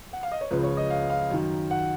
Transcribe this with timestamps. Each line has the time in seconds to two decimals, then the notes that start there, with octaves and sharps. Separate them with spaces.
0.13 F#5
0.23 F5
0.32 D#5
0.41 C#5
0.51 C#2 C#3 F3 B4
0.63 C#5
0.77 D#5
0.90 F5
1.10 F5
1.31 F#2 D#3
1.71 F#5